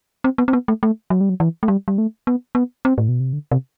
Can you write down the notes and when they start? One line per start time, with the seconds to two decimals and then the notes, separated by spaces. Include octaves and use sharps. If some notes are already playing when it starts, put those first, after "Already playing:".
0.24 C4
0.38 B3
0.48 C4
0.53 B3
0.68 A3
0.83 A3
1.10 F#3
1.21 G3
1.29 F#3
1.40 E3
1.63 A3
1.68 G3
1.88 G3
1.98 A3
2.27 B3
2.55 B3
2.85 C4
2.98 A2
3.08 B2
3.20 C3
3.33 D3
3.52 C3